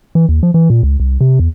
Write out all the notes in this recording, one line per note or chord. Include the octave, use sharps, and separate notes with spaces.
E3
D#2
F3
E3
A#2
C#2
C2
C3
E2